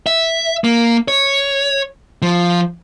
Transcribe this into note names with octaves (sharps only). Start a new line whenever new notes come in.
E5
A#3
C#5
F3